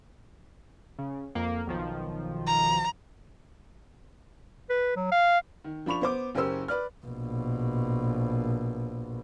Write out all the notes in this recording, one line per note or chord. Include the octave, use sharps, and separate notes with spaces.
C#3
F2 A#3
B1 D#3 F3
A#5
B4
F#3
F5
D#3
F3 D4 B5 C#6 F7
B3 C5 D6
F#1 C#4 G4 A#4 C5 E6
B4 D5 F6
A#1 B2